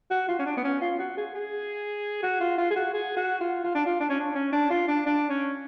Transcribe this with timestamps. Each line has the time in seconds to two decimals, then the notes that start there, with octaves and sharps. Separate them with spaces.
0.11 F#4
0.28 F4
0.39 C#4
0.46 D4
0.57 B3
0.64 C#4
0.81 F4
0.99 F#4
1.17 G#4
1.34 G#4
2.23 F#4
2.41 F4
2.58 F4
2.71 G#4
2.76 F#4
2.94 G#4
3.17 F#4
3.41 F4
3.64 F4
3.75 D4
3.86 F4
4.00 D4
4.10 C#4
4.20 D4
4.35 C#4
4.53 D4
4.71 F4
4.88 D4
5.06 D4
5.29 C#4